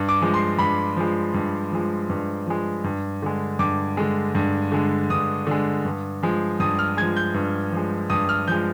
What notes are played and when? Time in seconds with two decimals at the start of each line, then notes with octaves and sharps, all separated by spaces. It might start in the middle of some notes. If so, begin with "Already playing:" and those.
Already playing: G2
0.09 D6
0.22 F3 G#3
0.34 C6
0.59 G2 B5
0.96 F3 G#3
1.34 G2
1.72 F3 G#3
2.10 G2
2.46 F3 G#3
2.84 G2
3.22 D3 G#3
3.59 G2 D6
3.97 D3 G#3
4.35 G2
4.72 D3 G#3
5.10 G2 D#6
5.47 D3 G#3
5.85 G2
6.23 F3 G#3
6.60 G2 D#6
6.79 F6
6.97 F3 G#3 G#6
7.17 G6
7.34 G2
7.72 F3 G#3
8.10 G2 D#6
8.29 F6
8.48 F3 G#3 G6